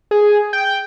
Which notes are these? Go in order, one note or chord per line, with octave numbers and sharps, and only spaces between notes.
G#4
G5